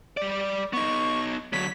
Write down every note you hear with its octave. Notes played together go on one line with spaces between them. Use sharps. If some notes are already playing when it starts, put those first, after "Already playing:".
G3 D5
B3 D#4 C#6
D3 F#3 B6